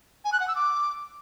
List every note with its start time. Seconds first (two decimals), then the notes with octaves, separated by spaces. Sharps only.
0.24 G#5
0.32 F#6
0.40 F#5
0.47 E6
0.55 D6